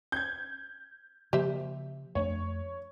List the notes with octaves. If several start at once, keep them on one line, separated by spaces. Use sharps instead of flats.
G6 G#6
C#3 F3 A#3 G4 C5 E5
F2 A3 D4 C#5